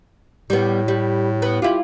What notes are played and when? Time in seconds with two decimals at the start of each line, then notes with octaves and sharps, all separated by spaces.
0.50 A2 G3 B3
0.88 G3
1.42 B3
1.62 E4 F4 G4